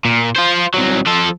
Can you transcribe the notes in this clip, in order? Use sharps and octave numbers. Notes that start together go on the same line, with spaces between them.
A#2
F4 C5
C2 F#3
F3 A4